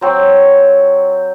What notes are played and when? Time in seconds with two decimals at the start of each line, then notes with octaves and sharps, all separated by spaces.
0.01 F#3 C4 C#6